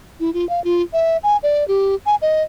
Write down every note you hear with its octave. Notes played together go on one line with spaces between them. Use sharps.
E4
F4
F5
F4
E5
G#5
D5
G4
G#5
D#5